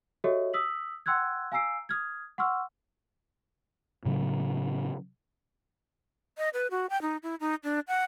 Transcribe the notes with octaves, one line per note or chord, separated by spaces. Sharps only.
F#4 G4 A4 C#5 D#5 E5
D#6 E6 B6 F#7
F#5 G5 C6 E6 F#6 G#6
F5 G#5 A#5 E6 C7 D7
D#6 F6 G#6
F#5 C6 C#6 E6 F6
A2 C#3 F#3
D#5
B4
F#4
G5
D#4
E4
D#4
D4
F#5